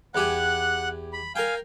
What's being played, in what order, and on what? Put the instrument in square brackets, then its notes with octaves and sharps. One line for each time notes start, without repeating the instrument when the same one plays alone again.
[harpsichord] E2 G4 G#5 [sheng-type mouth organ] F#5 F#6
[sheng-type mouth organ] B5
[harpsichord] A#4 G5 [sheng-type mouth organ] F5 G#5